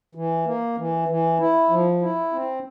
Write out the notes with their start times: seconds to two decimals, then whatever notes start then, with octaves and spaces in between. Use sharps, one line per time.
0.15 E3
0.46 A#3
0.77 E3
1.08 E3
1.39 E4
1.69 F3
2.02 E4
2.33 C4